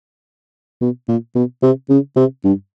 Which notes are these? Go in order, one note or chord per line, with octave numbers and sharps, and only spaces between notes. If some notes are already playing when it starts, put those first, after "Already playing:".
B2
A#2
B2
C3
C#3
C3
G2